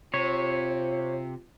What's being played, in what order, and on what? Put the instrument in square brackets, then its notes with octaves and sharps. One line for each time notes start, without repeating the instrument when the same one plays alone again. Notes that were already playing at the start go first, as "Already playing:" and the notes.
[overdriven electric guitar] C3 [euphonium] F4 [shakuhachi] C5 [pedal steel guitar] C#5